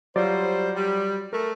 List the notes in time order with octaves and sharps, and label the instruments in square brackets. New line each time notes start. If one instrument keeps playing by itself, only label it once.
[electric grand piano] F#3 F4 [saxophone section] G3 C5 [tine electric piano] D5
[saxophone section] G3
[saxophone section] A3 [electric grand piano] A#4